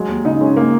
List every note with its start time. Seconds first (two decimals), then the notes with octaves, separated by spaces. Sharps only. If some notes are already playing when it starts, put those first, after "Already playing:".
Already playing: F#3 G#3
0.08 D#2
0.25 C#3 D#4
0.41 G#3 C#4
0.56 A#3